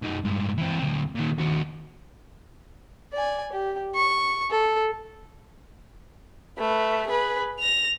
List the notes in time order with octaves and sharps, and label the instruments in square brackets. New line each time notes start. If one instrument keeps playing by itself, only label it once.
[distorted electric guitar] F#2 D#4
G2 G#3
E3 C4
D2 C4
A#2 D#3
D#2 F#4
[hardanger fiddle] D5 G#5
G4
C#6
A4
[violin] A3 B4
G#4 B4
A#6 F7